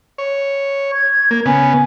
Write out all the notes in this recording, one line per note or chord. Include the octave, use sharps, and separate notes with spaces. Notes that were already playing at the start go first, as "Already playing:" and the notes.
C#5
G#6
A#3
C#3 B3 G#5